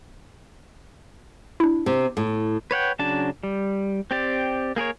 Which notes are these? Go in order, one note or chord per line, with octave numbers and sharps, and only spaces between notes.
D4 E4
C3
A2
B4 C#5 F#5 G5
C#3 F#3 D4 A5
G3
C4 G4 D5
A#3 G#4 A#4 C#5